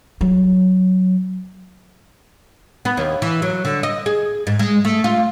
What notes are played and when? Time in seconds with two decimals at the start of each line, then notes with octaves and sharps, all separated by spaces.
0.21 F#3
2.85 B3
2.97 D#2
3.22 E3
3.42 F#3
3.65 D3
3.83 D#5
4.06 G#4
4.47 G#2
4.59 G#3
4.85 A3
5.04 F4